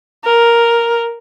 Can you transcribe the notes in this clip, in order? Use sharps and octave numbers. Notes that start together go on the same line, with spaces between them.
A#4